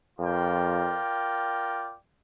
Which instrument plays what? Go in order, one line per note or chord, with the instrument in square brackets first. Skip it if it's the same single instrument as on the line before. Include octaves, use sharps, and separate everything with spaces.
[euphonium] F2 [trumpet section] F4 A#4 D5 G5